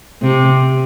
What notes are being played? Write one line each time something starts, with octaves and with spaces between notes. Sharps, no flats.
C3